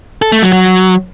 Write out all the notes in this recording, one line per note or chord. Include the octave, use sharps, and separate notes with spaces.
A4
A3
F#3
F#3